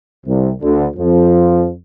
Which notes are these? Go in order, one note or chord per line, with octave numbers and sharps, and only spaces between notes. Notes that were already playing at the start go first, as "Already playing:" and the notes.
C2 C3
D2 D3
F2 F3